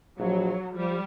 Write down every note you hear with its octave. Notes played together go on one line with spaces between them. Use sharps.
A#1 F#3
F3 G3